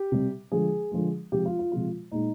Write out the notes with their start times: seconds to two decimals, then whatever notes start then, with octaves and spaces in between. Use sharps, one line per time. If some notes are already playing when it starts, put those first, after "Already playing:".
Already playing: G4
0.12 C3 G3
0.52 D3 F3 G#3 G#4
0.92 D3 F3 G#3
1.32 C3 F3 G#3 G4
1.45 F4
1.59 F4
1.72 C3 F3 G#3 F4
2.12 A#2 G#3 D#4